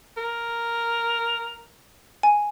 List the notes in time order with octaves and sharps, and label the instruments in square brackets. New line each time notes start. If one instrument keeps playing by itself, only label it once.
[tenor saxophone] A#4
[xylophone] G#5